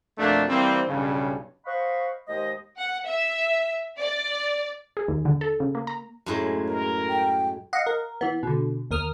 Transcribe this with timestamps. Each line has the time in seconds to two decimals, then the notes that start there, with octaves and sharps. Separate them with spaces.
0.18 F2 B2 A3 A#3 D4
0.49 E3 G3 A#3 C4
0.88 B1 G2 C#3
1.66 C5 D#5 F5 F#5 B5 C#6
2.28 D#2 G#3 C5 D#5
2.78 F#5
3.07 E5
3.98 D5
4.97 G#4
5.08 D#2
5.25 D3
5.41 A4
5.60 C#3
5.75 A#3
5.87 A#5
6.26 F#2 A2 G#3
6.68 A#4
7.09 G5
7.73 D#5 F5 F#5
7.87 A#4
8.21 E3 B3
8.43 B2 D3
8.91 D#2 A#4 D#6 F6